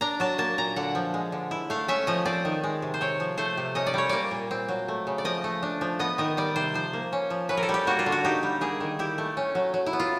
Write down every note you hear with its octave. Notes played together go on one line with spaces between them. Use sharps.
D4 A#5
F#3 A5
A#3 A5
A#2 A#5
D3 F#5
F3
G#3
D3
E4
A3 F5
C#4 E5
F3 D#5
C4 D5
D#3
G#3
C3
C5
C4 C#5
F3
A3 C5
C3
C#4 D#5
D5
G3 C#5
A#3 D5
A#2
C4
F#3
A3
C#3
D5
F3 D#5
A3
D4
F3
B3 D#5
D#3 D#5
G3 D5
C3 C5
F3 C5
A#3
C#4
F3
C#4 B4
A#4
A4
G3
G4
A#3 F#4
F4
D3
F#4
D#4 G4
G3
A#3 G#4
D#3
E4 G4
A3
C#4
F#3
F#3
E4
B3
F4